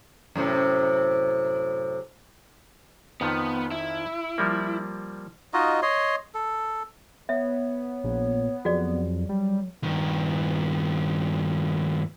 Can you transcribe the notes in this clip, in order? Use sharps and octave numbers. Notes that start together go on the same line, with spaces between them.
F#2 A2 C3
F2 D#3 F3 B3
E4
F3 G3 A#3
D#4 F4 F#4 D#5
C#5 D#5 C6
A4
B3 C#5 E5
A#1
F2 F#3 F#4 G#4 D5
G3
G2 D#3